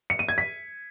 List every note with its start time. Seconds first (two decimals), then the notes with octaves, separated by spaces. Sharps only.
0.10 C#7
0.19 D#7
0.29 G#6
0.38 B6